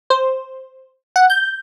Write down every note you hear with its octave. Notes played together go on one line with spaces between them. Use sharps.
C5
F#5
G6